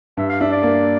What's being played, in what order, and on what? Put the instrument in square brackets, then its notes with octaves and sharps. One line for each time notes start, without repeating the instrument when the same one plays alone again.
[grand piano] G2 [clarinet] E5
[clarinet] F5
[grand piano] D4 [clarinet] E5
[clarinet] D5
[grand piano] A#3